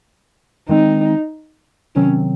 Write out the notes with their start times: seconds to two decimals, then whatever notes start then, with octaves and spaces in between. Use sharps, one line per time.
0.69 D#3 G#3 C4 D#4
1.96 C3 D#3 F#3 C4 C#4